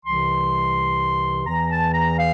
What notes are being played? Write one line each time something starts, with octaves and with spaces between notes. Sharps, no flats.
C2 C3 E3 C6
E2 E3 A#5
A5
A#5
F5